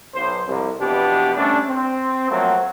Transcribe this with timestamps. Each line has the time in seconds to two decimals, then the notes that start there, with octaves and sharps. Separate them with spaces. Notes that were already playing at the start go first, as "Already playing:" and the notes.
0.15 B1 C5
0.47 C2 F2
0.80 F2 B2 E3 B3 D4 G4
1.36 G3 A3 C#4 D4
1.68 C4
2.31 F3 F#3 A3 A#3 C4 F#4